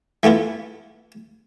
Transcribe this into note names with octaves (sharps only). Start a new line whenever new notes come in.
E3 A3 B3 E4 F4